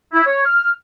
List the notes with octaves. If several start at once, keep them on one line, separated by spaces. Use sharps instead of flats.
E4
C#5
F6